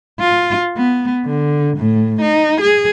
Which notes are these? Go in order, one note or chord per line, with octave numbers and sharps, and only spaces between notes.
F4
B3
D3
A2
D#4
G#4